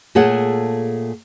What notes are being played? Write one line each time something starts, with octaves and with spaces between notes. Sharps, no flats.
A#2 A3 G#4 A4 C#5 F#5